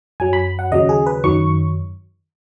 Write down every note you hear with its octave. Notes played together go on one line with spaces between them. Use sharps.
F#2 F#3 G#5
B5
F#5
D#2 C#3 F#3 D#5
G#4
B4
F#2 D#3 F#3 C#6